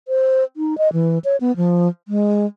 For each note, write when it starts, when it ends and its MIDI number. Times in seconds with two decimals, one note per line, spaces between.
0.08 0.44 72
0.57 0.78 63
0.78 0.91 75
0.93 1.19 52
1.25 1.37 73
1.41 1.55 59
1.57 1.88 53
2.08 2.46 56